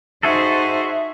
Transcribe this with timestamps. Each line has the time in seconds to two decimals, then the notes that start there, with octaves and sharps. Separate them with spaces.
0.23 D#4 F#4 G#4 A4 C5 E5